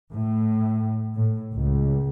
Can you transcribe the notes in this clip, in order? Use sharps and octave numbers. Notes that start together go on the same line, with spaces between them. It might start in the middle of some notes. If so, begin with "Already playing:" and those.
A2
A2
C#2